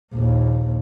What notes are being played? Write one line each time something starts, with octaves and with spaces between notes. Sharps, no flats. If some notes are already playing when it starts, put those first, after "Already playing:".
A#1 D#2